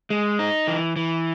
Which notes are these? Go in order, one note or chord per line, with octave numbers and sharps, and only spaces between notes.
G#3
D#4
E3
E3